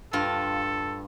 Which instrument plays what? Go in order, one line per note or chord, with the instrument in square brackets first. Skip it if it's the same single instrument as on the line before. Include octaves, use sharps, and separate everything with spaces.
[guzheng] G2 F4 [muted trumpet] A4